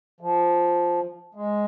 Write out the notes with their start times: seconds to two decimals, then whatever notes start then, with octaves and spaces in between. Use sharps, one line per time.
0.21 F3
1.35 G#3